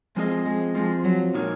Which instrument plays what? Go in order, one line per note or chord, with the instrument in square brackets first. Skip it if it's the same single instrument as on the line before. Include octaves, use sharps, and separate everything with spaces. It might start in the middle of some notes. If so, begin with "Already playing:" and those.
[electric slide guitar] F3 C4 F4 G#4 D#5 [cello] G#3
[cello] G#3
[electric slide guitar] F3 C4 F4 [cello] G#3
[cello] F#3
[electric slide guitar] A#2 G#3 D#4 A#4 C#5